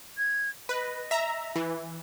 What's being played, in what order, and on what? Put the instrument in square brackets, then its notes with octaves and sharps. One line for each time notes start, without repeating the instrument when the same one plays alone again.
[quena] G#6
[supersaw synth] B4 [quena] D#5
[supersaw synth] E5 A#5
E3